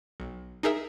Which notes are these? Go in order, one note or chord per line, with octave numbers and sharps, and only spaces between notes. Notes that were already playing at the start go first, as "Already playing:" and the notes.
B1
D#4 G#4 A#4 E5